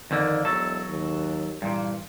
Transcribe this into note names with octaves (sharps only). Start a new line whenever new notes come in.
F2 D3 D#3 A#3
E1 F#3 A4
D#2
G2 A#2 E3